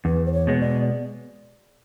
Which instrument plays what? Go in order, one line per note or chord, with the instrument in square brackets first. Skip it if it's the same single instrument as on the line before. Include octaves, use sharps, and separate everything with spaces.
[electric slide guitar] E2 [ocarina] B4
[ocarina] C5
C#5
[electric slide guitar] B2 G#3 B3
[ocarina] D5